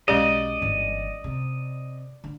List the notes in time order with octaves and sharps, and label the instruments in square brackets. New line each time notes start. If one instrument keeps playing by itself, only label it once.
[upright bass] B1 [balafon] G#3 C#4 G4 [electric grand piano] D5 [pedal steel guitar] D#5
[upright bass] G1 E3
C3
D3